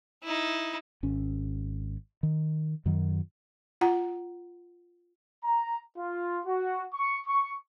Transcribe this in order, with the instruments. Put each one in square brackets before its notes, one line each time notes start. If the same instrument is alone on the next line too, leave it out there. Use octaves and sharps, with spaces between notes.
[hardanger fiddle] D#4 E4
[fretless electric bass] G#1 C#4
D#3
F#2 D#3 F#3
[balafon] F4 F#5 A#5
[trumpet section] A#5
F4
F#4
C#6
C#6